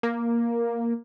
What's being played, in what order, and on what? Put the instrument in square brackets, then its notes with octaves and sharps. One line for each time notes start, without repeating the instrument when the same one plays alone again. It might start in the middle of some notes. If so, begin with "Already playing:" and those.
[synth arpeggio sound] A#3